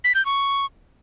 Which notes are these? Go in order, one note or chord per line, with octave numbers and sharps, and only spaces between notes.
B6
G6
C#6